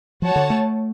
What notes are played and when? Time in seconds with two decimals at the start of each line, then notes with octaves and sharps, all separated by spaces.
0.22 F3 F#4 C#5 F#5 A5
0.36 D3
0.50 A3